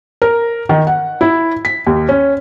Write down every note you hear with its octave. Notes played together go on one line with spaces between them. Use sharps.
A#4
D#3
F#5
E4
B6
D#2
C#4